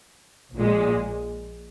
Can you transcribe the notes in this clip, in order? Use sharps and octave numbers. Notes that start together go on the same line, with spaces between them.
A#1 A#2 G#3